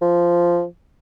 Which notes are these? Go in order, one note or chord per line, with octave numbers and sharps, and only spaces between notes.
F3